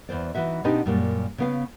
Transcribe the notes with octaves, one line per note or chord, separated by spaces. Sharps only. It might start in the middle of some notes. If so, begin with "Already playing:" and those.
E2 E3 C5 D5
E3 D#4 F#4 E5
B2 B3 C4 D4 D#4 G4
F#2 A#2 G3
C#3 B3 F5